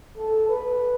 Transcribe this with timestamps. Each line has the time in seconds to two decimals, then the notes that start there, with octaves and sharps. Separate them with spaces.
0.18 A4
0.49 B4